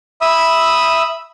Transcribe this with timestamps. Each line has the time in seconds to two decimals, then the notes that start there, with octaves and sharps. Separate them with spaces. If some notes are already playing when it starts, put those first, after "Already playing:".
0.21 E5 B5 D#6 E6